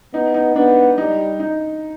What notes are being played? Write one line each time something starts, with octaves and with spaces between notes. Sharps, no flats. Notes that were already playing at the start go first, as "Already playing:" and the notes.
B3 D#4
D#4
B3 D4
G3 D#4
D#4